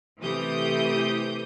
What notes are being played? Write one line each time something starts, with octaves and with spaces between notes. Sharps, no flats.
C3 E3 A3 G4 D#6 G6